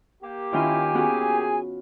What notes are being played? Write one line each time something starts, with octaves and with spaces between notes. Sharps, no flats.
A#3 G4
D#3 C#4 E4 F4 G#5
B3 C#4 F#4 G#4